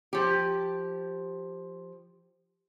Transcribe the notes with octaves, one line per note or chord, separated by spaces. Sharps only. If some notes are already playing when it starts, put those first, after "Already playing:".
F3 G4